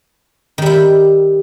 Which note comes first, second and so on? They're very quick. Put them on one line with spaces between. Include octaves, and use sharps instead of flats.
D#3 G3 E4